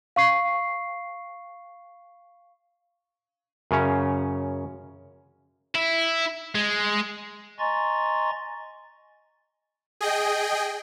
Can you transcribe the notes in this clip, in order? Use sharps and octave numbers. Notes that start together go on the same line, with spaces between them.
F5 C#6 C7
F#2 C#3 C#4
E4
G#3
D#5 G#5 A#5 C6 C#6 A6
G#4 D#5 G5